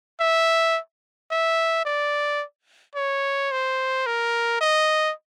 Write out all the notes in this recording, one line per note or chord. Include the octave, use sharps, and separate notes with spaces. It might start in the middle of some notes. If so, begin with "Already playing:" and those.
E5
E5
D5
C#5
C5
A#4
D#5